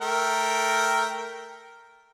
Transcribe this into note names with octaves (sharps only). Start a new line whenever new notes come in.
A3 A#4 G5